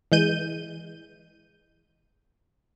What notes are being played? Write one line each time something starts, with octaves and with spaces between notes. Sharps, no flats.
E3 G#3 G6 D#7